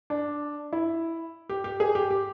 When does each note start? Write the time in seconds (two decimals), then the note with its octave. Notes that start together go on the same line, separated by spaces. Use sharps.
0.10 D4
0.73 E4
1.49 G4
1.64 G4
1.80 G#4
1.95 G4
2.10 G4